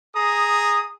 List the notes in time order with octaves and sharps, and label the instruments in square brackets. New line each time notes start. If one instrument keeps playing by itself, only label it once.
[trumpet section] G#4 A#5 D#6